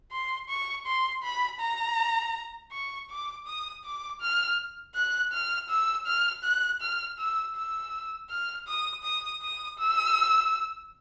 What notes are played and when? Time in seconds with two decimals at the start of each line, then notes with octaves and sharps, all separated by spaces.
0.12 C6
0.49 C#6
0.86 C6
1.23 B5
1.60 A#5
2.72 C#6
3.10 D6
3.46 D#6
3.84 D6
4.21 F6
4.95 F#6
5.32 F6
5.69 E6
6.06 F6
6.44 F#6
6.81 F6
7.19 E6
7.55 E6
8.30 F6
8.67 D#6
9.03 D#6
9.42 D#6
9.78 E6